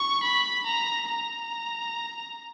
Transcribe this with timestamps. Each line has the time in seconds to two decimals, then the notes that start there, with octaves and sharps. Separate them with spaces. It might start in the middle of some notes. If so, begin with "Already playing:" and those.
Already playing: C#6
0.23 B5
0.67 A#5
1.09 A#5